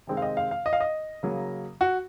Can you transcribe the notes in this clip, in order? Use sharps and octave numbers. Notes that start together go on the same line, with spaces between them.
C3 D#3 G#3 C4
F5
D#5
F5
F5
D#5
F5
D#5
C#3 F#3 A#3
F#4